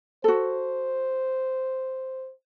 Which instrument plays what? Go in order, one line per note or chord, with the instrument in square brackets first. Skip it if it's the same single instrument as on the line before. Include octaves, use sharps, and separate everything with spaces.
[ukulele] F#4 A4 [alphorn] C5